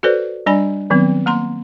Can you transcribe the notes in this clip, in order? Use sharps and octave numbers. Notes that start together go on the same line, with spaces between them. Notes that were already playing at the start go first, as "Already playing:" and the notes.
F#4 A4 B4 C5 D5
G3 D4 D5 G#5 B5
D#3 F#3 B3 C4
A#3 A#5 C6